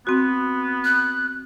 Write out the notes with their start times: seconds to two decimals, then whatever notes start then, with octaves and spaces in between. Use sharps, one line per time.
0.07 B3 C4 F#4
0.84 F#6